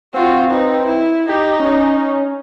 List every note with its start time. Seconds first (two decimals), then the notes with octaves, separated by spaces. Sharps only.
0.14 C4 F4 F#4
0.51 D#4 B4
0.86 E4
1.29 D#4 G4
1.60 C#4